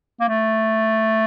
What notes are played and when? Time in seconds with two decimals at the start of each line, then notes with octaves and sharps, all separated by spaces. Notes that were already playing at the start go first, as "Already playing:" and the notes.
0.20 A#3
0.29 A3